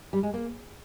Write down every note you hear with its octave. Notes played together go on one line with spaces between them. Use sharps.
G3
G#3
A#3